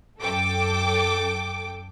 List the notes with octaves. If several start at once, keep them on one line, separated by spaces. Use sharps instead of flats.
F#2 A4 G5 D6